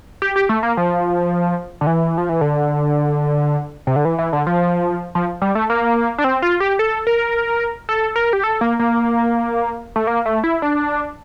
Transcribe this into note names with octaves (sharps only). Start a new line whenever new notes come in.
G4
G4
A3
A#3
F3
D3
E3
F3
E3
D3
C3
D3
E3
E3
D3
F3
F3
G3
A3
A#3
D4
C4
F4
G4
A4
A#4
A4
A#4
G4
A4
A#3
A#3
A3
A#3
A3
E4
D4